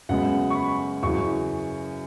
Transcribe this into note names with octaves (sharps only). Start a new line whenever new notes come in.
F#2 C#3 G#3 B3 F#5
C#6
B5
F#2 C#3 E3 C#6